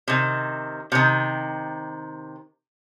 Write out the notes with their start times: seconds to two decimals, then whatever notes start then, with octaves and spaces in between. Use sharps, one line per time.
0.08 C3 D#3
0.92 C3 D#3